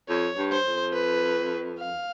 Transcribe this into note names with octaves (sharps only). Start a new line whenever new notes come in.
F2 C#5
G2
C5
F2
B4
F5